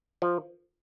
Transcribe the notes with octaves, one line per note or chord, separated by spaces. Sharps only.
F3